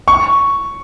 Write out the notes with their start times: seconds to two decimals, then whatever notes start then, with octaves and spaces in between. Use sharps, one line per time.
0.08 C#6